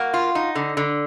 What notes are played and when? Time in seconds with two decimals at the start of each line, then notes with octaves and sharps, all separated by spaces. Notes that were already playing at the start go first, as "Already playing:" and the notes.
Already playing: A#3 F#4
0.14 F4
0.35 D#4
0.55 D3
0.77 D3